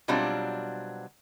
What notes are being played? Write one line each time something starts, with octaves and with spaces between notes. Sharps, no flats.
B2 F#3 G3 C4 D4 F4